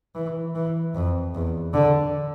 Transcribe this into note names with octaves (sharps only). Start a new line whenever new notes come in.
E3
E3
F2
E2
D3